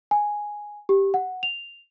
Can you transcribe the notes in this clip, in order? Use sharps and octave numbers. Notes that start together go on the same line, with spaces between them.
G#5
G4
F#5
F7